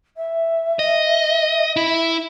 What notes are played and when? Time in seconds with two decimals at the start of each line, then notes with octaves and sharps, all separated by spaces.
0.17 E5
0.79 D#5
1.76 E4